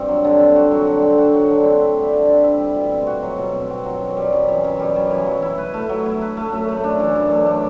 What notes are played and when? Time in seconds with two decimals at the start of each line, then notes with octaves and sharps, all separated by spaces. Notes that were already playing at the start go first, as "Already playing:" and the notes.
Already playing: G2 C4
0.08 F#3
0.24 D3
0.40 C4
0.56 F#4
0.71 F#3
0.87 D3
1.02 C4
1.18 F#4
1.34 F#3
1.50 D3
1.66 C4
1.81 E4
1.97 G3
2.13 D3
2.28 C4
2.44 E4
2.60 G3
2.76 B2
2.91 C4
3.07 F#4
3.23 F#3
3.38 B2
3.54 C4
3.70 F#4
3.85 F#3
4.01 F#2
4.17 G3
4.33 F#2
4.48 E3
4.64 F#2
4.80 G3
4.96 F#2
5.11 E3
5.26 F#3
5.42 E4
5.58 B4
5.74 A3
5.89 F#3
6.06 E4
6.21 B4
6.37 A3
6.52 F#2
6.68 A3
6.84 D4
7.00 E3
7.15 F#2
7.31 A3
7.47 D4